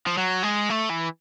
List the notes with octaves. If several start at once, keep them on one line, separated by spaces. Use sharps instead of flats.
F3
F#3
G#3
A3
E3